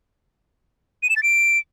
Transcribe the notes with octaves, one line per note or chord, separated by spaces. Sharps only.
D#7
E7
A6
D7